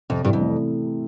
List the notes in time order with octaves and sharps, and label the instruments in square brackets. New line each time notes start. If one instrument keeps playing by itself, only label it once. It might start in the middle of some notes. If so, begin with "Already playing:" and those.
[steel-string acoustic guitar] F2 [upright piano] C3
[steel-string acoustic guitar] G2 [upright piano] E3
[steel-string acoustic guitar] F2
[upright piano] A3